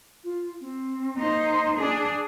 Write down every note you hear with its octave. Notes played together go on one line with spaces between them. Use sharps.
F4
C4
A#3 D#4 C5
D4 G#4